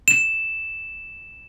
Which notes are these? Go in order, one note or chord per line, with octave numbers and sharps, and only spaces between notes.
E7